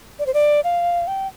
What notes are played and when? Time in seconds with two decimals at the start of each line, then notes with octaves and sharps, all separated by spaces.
0.19 D5
0.26 C5
0.34 D5
0.64 F5
1.07 G5